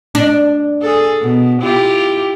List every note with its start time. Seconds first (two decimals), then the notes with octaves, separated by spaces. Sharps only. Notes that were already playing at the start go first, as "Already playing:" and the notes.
0.15 D4
0.82 G#4 A4
1.22 B2
1.62 E4 F4 G4